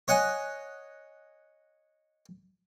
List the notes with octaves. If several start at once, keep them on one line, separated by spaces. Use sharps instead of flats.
C#5 D#5 F#5 G#5